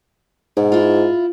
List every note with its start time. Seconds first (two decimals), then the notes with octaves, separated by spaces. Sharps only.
0.57 G#2 B2
0.72 E4 F4